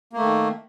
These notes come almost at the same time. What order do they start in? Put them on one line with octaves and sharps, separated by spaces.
A#3 A3 D#3